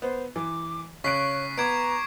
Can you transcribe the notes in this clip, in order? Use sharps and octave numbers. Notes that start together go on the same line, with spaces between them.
B3 C5
E3 D6
C#3 C#5 C#6 F#6 B6 C7 D7
B3 A#5 D6 G#6 D7